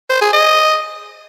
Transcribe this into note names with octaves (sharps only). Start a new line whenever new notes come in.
C5
G#4
D#5